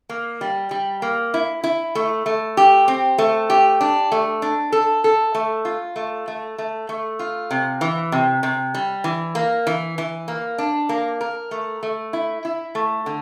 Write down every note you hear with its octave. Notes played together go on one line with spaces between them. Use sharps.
A#3
G3
G3
A#3
E4
E4
A3
A3
G4
C4
A3
G4
D4
A3
D4
A4
A4
A3
F4
A3
A3
A3
A3
F4
C3
E3
C3
C3
G3
E3
A#3
E3
E3
A#3
D4
A#3
A#4
A3
A3
E4
E4
A3
D3